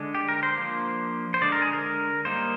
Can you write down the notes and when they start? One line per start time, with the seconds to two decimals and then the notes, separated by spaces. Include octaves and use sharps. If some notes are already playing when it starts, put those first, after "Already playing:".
Already playing: D3 G#3 D4
0.15 G4
0.29 A#4
0.43 C5
0.57 F3 A#3 D4
1.34 C5
1.42 D3 G#3 D4 D5
1.52 A#4
1.62 G#4
1.73 A#4
2.25 G3 A#3 D#4 C5